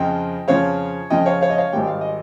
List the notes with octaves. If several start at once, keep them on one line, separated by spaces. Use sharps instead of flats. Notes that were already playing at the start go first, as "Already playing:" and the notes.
Already playing: F2 C#3 F3 D#5 G5
F2 C#3 F3 C#5 F5
F2 C#3 F3 D#5 G5
C#5 F5
C#5 F5
D#5
C#5 F5
G#1 G#2 D#3 G3 G5
F5
D#5